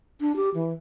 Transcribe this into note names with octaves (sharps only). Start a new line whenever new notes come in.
D4
G4
E3